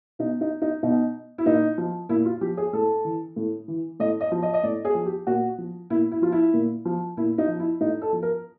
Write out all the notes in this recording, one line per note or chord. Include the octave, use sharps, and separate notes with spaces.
B2 D#4
D#4
D#4
B2 D#4
E4
A#2 D#4
F3
A#2 E4
F4
F3 G4
G#4
A2 A4
E3
A2
E3
A2 D#5
D#5
F3
D#5
D#5
A2 D5
G#4
F3
G4
A#2 F#4
F3
A#2 E4
E4
F3 F4
E4
A#2
F3
A#2 E4
D#4
F3
E4
A2 D#4
A4
F3
A#4